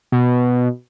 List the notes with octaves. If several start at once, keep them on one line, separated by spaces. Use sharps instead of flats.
B2